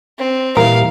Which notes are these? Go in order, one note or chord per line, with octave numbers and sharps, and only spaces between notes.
C4
A#2 E3 G3 A#4 F5